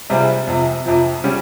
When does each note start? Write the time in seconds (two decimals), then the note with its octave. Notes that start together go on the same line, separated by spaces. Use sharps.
0.10 C3 G3 C4 F4 G#4
0.47 F2 C3 F3
0.85 F2 C3 F3
1.24 C#3 G3 C#4 G4